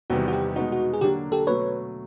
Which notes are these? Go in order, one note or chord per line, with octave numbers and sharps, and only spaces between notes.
E2 C3 D#3 G3 B3 F#4
F#4
G4
B2 G#3 B3 D#4 F#4
F#4
G#4
D3 F#3 A#3 D4 F#4 G4
G4 A4
B2 F#3 A3 B4 C#5